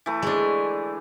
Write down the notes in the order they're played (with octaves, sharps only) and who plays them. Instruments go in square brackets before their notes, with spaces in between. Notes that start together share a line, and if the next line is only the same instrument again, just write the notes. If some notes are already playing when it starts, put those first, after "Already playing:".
[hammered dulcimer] E3 A3
[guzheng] G#3 D4